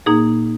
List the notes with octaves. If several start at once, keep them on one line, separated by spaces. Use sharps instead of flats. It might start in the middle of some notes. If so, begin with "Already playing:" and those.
A#2 A#3 D#4 G#4